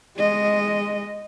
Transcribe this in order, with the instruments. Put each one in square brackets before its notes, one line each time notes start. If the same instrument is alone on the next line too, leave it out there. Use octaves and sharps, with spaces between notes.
[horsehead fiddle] G#3 D#5